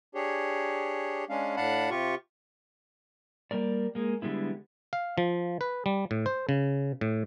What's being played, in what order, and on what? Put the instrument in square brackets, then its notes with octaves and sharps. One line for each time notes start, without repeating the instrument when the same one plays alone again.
[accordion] D4 G4 G#4 C#5
G#3 C#4 D4 F5
A2 D4 F5 F#5 A5 B5
C3 F4 G4 C#6
[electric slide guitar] G3 A#3 A#4 D5
G#3 A#3
D3 G3 G#3 B3 E4
[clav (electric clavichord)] F5
F3
B4
G3
A2
C5
C#3
A2